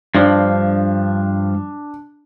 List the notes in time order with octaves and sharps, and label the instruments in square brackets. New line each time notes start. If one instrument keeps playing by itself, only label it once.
[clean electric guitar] G2 F3 [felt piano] D4